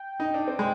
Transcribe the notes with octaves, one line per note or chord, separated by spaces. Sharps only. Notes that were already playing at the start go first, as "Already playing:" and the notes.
Already playing: G5
D#4
D4
C4
G#3